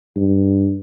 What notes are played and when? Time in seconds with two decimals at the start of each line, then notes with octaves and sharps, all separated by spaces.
0.16 G2